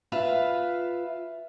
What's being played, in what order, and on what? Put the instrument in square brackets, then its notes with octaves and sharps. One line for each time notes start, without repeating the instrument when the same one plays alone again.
[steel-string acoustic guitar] F4 B4 E5 F5